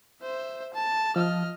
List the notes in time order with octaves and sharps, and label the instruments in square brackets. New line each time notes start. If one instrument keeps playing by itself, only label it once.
[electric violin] C5 E5
A5
[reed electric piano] F3 [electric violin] D#5 F6